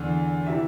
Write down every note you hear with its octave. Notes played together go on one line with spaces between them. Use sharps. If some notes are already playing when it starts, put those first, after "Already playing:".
Already playing: E2 D3
C3 E3 E5